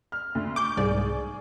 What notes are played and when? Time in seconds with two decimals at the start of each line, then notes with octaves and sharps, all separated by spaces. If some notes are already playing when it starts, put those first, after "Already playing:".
0.12 F6
0.35 D2
0.56 C#6 D6 G6
0.77 C2 G#2 G#4 D5